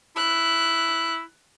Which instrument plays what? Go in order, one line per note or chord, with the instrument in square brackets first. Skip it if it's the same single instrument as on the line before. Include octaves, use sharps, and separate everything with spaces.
[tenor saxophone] E4 [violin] F#6